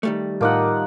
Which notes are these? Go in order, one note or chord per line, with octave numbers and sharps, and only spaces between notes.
D#3 G3 A3
A2 F3 D#4 A#4 F#5 D6